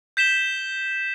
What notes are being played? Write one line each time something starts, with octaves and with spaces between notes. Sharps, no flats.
G6 B6 E7 G7